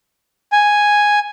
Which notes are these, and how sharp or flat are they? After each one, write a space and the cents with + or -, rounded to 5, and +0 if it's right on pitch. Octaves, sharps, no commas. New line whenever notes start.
G#5 +0